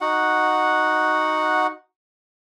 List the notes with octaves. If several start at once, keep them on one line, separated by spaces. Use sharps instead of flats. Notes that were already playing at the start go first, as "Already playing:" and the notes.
D#4 F#4 F#5